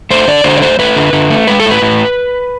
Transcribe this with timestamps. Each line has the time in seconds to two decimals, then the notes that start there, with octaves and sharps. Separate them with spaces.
0.11 A3 C5
0.28 D3 D5
0.44 D3 C5
0.57 D5
0.62 A3 C5
0.79 A3 B4
0.96 D3
1.13 D3
1.30 A3
1.47 G#3 B4
1.60 A4
1.66 A2
1.71 B4
1.82 A2